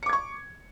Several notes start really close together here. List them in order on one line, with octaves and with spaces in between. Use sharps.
C#7 D6 G#6 C#6